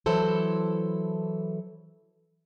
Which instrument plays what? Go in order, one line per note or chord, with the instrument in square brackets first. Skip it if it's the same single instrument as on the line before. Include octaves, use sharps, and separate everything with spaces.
[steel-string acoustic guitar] E3 F#3 E4 A4 C5